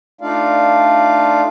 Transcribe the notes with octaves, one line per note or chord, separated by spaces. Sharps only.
A3 D4 D#4 F4 D5 F5